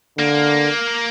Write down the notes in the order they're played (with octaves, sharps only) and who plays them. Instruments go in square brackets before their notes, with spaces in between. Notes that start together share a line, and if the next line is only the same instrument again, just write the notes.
[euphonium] D3 [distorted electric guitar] A#3